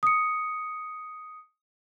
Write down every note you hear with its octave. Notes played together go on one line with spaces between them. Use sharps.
D#6 C#7